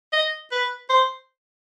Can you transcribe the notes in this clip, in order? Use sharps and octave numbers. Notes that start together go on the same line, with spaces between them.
D#5
B4
C5